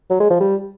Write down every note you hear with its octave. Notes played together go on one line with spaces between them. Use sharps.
F#3
G#3
F3
G3